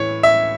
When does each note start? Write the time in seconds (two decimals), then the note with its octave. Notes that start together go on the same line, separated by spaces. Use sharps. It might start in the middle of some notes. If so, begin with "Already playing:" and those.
Already playing: A2 E3 C#5
0.23 E5